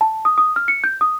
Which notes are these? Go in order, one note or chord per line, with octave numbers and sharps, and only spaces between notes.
A5
D#6
D#6
F6
C#7
G6
D#6